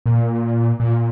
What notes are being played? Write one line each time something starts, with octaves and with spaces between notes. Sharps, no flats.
A#2
A#2